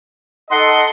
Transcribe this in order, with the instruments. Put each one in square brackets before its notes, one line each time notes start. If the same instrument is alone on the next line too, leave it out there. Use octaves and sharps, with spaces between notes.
[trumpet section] D#4 F#5 [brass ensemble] A4 D#5 [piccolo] C6